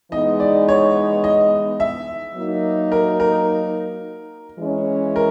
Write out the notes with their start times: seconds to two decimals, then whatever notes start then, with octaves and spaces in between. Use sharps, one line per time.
0.12 E3 G#3 B3 D#4 D#5
0.40 D5
0.68 C#5
1.24 D#5
1.80 E5
2.35 F#3 A#3 D#4
2.92 A#4
3.20 A#4
4.59 E3 G#3 C#4
5.16 A#4